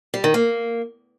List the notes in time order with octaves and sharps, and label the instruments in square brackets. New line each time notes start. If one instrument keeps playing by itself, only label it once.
[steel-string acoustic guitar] G3
D#3
A#3